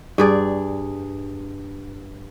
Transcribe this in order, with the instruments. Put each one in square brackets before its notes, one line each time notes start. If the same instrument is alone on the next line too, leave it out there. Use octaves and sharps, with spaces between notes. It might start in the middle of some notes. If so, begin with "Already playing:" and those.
[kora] G2 G#4 D5